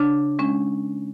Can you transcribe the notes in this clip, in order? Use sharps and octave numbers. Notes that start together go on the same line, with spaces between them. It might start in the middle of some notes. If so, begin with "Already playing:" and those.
Already playing: C#3 D4
G#3 C#4